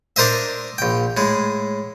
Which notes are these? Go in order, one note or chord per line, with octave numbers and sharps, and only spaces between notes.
D4 A#4 C5 D#5 E5
A#1 G5
A2 G#3